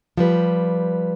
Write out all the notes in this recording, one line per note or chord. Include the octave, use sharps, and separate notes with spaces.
F3 G3 B4